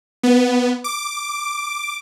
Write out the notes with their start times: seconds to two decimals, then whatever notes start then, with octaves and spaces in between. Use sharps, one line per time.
0.23 B3
0.84 D6